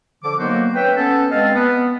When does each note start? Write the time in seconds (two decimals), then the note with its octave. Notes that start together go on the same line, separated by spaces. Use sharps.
0.24 D3 F3 D6
0.39 D#3 F#3 A#3 B3 F#4 C5
0.75 C#4 B4 E5 G5
0.97 B3 C#4 A4
1.31 G2 G#3 C4 D#5 F5 A5
1.55 B3